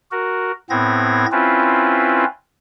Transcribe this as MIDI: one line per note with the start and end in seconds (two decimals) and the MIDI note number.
0.11 0.52 66
0.11 0.52 70
0.70 1.26 45
0.70 1.26 59
0.70 1.26 60
0.70 1.26 92
0.70 1.26 94
1.32 2.25 60
1.32 2.25 61
1.32 2.25 64
1.32 2.25 65
1.32 2.25 71